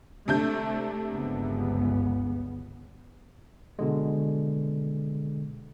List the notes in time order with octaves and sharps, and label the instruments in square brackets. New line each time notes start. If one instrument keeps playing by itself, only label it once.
[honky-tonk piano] C3 D4 G6 [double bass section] A3
[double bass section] G1 C#2 B3
[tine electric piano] B2 D3 G#3